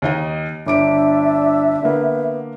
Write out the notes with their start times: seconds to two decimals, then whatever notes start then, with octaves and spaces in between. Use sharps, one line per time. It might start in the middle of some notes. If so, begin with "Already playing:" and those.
0.02 D#2 D#4 D#5
0.66 G1 D4 E5 D6 D7
1.82 D3 A#3 B3